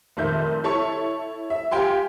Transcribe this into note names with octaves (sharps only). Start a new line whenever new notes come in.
F1 A#2 D#3 E5 G6
E4 A4 C#5 A5 C#6
E5
F4 G4 G5 G#5 C6